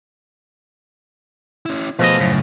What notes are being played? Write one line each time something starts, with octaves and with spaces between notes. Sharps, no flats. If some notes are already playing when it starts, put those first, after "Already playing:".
C#4 E4
B2 F3 A3 G#4 B4 D#5
F#2 A2 C#3